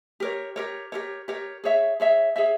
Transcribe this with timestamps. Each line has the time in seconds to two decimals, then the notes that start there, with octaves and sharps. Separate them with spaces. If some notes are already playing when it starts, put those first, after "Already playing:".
0.20 G4 A#4 C#5
0.56 G4 A#4 C#5
0.92 G4 A#4 C#5
1.28 G4 A#4 C#5
1.64 G#4 C#5 E5
2.00 G#4 C#5 E5
2.36 G#4 C#5 E5